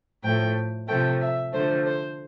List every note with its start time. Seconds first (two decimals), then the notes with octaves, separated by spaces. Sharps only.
0.23 A2 F3 A3 G5
0.88 C3 F3 A3 G5
1.20 E5
1.53 D3 F3 A3 C5
1.85 C5